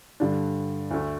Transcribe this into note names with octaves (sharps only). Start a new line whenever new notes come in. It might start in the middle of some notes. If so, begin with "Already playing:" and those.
G2 D3 G3 D4
D2 D3 A3